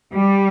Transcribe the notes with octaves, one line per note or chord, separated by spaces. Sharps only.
G3